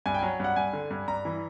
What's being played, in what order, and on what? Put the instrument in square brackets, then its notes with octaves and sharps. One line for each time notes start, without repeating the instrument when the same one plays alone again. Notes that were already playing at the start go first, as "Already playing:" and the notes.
[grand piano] G2 G#5
G5
F#3 G#5
G2 F#5
G2 G#5
D3
G2
G2 A#5
E3